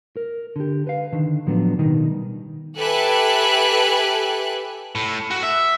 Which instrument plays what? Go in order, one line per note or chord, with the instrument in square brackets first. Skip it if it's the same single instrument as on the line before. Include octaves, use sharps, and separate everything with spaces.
[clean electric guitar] A#4
D3 G4
B4 F5
D3 D#3
A2 F3 F#3 B3 D4
B2 D#3 G3 D#4
[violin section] G4 A4 B4 E5 G#5 F#6
[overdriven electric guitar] A2
F#4
E5